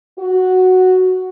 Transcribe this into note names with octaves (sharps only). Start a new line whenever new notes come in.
F#4